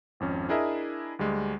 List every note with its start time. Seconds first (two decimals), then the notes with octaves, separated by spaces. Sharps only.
0.20 G#1 F2 C#4
0.49 D4 E4 G#4 A#4 D#5 E5
1.19 D2 G3 G#3